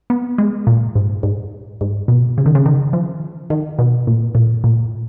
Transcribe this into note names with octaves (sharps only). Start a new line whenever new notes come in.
B3
G#3
A#2
G#2
G#2
G#2
B2
C#3
D#3
C#3
D#3
F3
D#3
B2
A#2
A#2
A#2